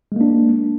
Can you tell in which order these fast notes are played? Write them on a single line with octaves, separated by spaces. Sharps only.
G#3 A#3 D4